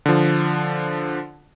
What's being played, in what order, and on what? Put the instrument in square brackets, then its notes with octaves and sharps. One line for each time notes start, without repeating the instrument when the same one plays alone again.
[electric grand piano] D3 F3